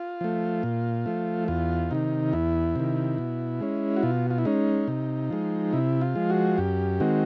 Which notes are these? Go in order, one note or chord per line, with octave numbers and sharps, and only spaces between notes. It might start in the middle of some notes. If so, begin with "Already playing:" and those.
Already playing: F4
F3 A3
A#2
F3 A3
E2 F4
C3 D#3 D#4
E2 E4
C3 D#3
B2
G#3 C#4
F#4
B2 F4
F4
E4
G#3 C#4 D#4
C3
F3 G#3
C3 E4
F4
F3 G#3
F#4
F#2 G4
D#3 G#3 C4 F#4